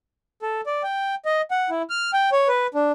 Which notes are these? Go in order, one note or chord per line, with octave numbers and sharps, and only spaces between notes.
A4
D5
G5
D#5
F#5
E4
F6
G5
C#5
B4
D4